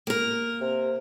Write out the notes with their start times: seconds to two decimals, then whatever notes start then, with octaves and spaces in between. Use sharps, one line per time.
0.07 A#3 A#4
0.61 C3